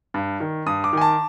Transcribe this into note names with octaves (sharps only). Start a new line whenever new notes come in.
G2
D#3
G2 D#6
D6
D#3 G#5
A5